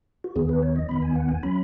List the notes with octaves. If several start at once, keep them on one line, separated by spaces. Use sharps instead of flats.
F#4
D#2 D#3 B3 G#4
B4
C#5
D#5
D#2 D#3 B3 B5
G#5
F#5
G#5
F#3 C#4 B5